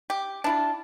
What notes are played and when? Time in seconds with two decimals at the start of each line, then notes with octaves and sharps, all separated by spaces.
0.10 G4
0.44 D4 E4 F4